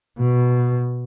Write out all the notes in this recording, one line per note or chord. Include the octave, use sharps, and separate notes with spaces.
B2